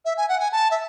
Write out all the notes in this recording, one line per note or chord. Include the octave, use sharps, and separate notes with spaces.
E5
G#5
F#5
G#5
A5
E5